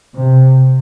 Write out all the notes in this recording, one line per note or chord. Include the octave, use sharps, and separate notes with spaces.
C3